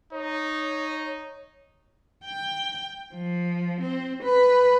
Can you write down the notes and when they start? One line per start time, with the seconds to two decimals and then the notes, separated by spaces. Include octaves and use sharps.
0.12 D#4 C#5
2.25 G5
3.14 F3
3.81 C4
4.23 B4